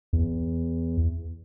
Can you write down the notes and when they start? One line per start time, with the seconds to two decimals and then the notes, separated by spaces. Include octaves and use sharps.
0.13 E2